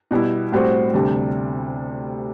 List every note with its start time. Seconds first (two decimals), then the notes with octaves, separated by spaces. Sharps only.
0.11 B2 G3 B3 E4
0.52 A2 G3 C4 F#4 C5
0.94 D2 C3 G3 D4